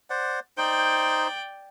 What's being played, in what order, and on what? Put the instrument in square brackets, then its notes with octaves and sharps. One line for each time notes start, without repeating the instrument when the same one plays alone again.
[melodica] C5 D5 F#5
[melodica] D#4 C5 [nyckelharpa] D5 G5